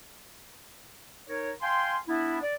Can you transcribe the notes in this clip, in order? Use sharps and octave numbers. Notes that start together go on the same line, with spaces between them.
D#4 A#4 C#5
F5 G5 G#5 C6
B3 D4 E4
D5